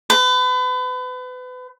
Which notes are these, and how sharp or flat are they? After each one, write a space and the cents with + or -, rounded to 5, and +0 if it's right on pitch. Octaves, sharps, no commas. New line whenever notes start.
B4 +35